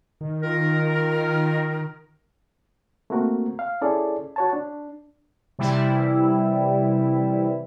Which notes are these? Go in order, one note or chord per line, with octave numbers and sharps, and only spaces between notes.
D#3
F4 A#4
A3 A#3 C4 F#4 A#4
F5
C#4 E4 G#4 A4 D5
F#4 C#5 A5
D4
C3 E3 G3 E4